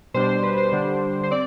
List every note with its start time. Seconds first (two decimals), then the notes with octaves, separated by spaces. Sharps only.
0.14 B2 G3 D4 C5
0.29 C5
0.43 B4
0.58 C5
0.72 D3 G3 D4
1.23 C5
1.31 C4 D5